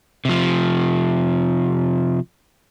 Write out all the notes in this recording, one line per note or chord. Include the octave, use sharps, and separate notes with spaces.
C3 F3